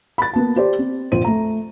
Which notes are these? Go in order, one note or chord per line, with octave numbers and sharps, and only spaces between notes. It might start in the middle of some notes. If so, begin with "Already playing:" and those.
B5 A6
A#3 B3 A5
G4 C5 D5
C4
A#1 F2 C5 D#7
A3 A#5